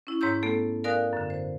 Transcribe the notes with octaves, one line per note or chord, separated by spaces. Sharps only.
C#4 E4
G#2 C#5 A#5 E6 G6
A3 B3 A4
A#4 D5 F5 G#5 D#6 F#6
F#2 D3
C5